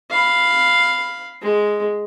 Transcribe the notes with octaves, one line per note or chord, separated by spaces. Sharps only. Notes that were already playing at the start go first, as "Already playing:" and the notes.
F5 B5
G#3